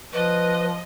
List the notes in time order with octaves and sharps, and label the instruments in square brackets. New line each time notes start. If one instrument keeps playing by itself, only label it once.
[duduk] F3 [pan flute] B4 [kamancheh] D#5